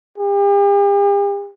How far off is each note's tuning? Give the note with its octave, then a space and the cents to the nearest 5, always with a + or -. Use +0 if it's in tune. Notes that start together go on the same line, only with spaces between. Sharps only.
G4 +45